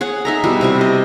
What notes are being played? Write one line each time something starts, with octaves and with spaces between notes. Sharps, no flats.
G#4 C#5 F#5
D#4 E5 A#5
B2 G3 E4 E5
C3 G3 C#6
D#5